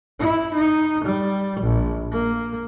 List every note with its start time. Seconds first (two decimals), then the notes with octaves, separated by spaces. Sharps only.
0.20 E4
0.55 D#4
1.05 G3
1.61 A#1
2.12 A#3